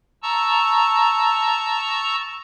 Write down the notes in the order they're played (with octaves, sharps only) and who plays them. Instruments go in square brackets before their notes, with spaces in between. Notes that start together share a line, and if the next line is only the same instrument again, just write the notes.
[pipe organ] A5 A#5 C#6 E6